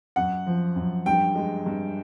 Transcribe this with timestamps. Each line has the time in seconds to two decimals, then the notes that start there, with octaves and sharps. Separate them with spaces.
0.16 F#2 F#5
0.46 F3
0.76 F#2
1.06 G2 G5
1.35 G#3
1.66 G2